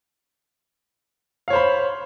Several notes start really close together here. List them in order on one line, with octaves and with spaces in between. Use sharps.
F5 C#5 C5 B5